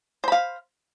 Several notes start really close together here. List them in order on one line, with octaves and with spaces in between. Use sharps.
C5 B5 F5